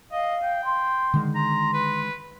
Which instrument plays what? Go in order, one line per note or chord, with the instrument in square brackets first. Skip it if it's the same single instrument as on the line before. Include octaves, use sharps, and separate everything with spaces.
[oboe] D#5 [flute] F5
[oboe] G5
[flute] C6
[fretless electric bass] D3 D#3 G#3
[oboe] A#5 [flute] C6
[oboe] B4